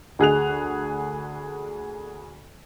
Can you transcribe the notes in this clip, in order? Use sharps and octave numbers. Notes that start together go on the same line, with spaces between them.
D2 G#4 F#6 F7